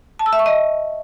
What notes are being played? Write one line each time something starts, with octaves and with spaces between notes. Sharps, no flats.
A5
E6
E5
C#6
D#5